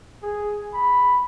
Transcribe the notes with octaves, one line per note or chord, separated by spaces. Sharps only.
G#4
B5